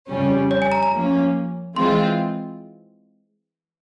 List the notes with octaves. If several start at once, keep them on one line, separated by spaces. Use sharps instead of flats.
F2 C#3 G3 C#4
C#5
G#5
A#5
A#5
F3 A#3 C#4
E3 G#3 C4 F4 C6